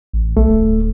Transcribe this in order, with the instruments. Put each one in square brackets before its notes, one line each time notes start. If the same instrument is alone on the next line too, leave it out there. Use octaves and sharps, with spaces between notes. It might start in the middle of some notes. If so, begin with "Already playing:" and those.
[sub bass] A1
[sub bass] B1 [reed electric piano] A3
[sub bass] D1